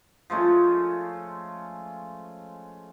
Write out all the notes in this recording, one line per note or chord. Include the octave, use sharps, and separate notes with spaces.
F3 G#3 A3 C#4